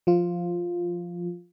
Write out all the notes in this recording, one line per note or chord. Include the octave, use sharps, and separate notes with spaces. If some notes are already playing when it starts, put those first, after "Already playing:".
F3 F4